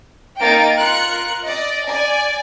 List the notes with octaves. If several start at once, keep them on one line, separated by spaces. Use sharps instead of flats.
A#3 D#4 G5 A6 D7
F4 A#4 F#6 C#7
D5 D#5
D5 G#5